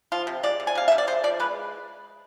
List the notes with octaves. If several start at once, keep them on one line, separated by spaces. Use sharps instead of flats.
F3 F4
C3
G#3 D5
C3
G#5
C3 F5
C3 E5
D5
G#3 C5
F3 D5
G#3 B4